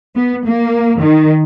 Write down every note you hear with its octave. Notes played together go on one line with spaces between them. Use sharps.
B3
A#3
D#3